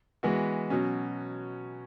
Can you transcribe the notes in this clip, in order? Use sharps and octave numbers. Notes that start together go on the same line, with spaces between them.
E3 G#3 B3 F#4
B2 F#3 C#4